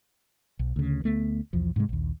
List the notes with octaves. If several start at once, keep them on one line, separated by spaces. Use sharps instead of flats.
B1
D2 C#3
D2 A3 B3
B1 E2 F3
G#2 C3 F3 G#3
A#1 D#2